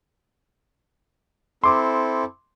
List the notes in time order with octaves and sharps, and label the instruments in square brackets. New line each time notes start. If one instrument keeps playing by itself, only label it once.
[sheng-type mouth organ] C4 E4 A4 [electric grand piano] C6 D6